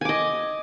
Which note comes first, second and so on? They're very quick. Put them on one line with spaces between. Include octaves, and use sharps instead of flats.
G#5 D6 D#5